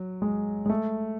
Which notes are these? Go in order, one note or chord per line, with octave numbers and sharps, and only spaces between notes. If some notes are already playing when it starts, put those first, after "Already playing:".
Already playing: F#3
G#3
G#3
A3